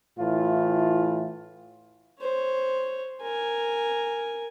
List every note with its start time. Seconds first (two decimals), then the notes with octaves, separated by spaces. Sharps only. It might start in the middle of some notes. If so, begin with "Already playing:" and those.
0.19 A2 E3 F4
2.20 C5 C#5
3.22 A#4 G#5